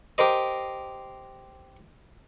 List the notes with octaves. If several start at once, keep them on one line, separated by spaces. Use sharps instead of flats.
G4 A#4 C5 D#5